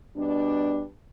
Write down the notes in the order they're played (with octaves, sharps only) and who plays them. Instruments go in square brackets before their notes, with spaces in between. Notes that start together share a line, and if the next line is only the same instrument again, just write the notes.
[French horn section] B2 G3 D4